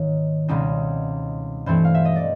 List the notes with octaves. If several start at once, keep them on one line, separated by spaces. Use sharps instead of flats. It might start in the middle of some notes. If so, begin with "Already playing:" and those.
Already playing: G#2 D#3 A#3 D#4 C#5
C#2 B2 G3 C4 D#4
G2 E3 A3 C4 C5
F5
E5
D#5
D5